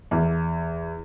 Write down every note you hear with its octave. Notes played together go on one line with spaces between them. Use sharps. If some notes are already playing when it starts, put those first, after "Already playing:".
E2